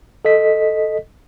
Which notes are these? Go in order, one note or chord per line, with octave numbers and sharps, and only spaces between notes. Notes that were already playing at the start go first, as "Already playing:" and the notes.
A4 D#5 B6